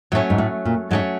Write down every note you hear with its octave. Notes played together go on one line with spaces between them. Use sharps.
A2 F#3 A3 C#4
G#2
A2
A#2
G#2 F#3 A3 C#4